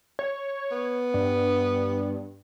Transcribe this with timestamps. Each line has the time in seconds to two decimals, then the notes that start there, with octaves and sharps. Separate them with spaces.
0.19 C#5
0.72 B3
1.14 G2